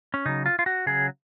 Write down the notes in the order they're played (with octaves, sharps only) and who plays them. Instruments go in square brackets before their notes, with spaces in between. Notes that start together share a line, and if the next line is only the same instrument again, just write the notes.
[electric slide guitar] C#4
C#3 F#3 D#4
F4
F4
F#4
C#3 F#3 G#4